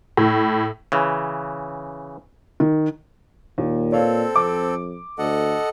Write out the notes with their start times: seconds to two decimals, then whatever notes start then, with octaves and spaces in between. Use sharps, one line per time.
0.17 A2
0.92 C#3 E3
2.60 D#3
3.58 D#2 A#2
3.92 C4 A4 C#5 D5 F5
4.36 F2 D6
5.18 D2 A4 D#5 F#5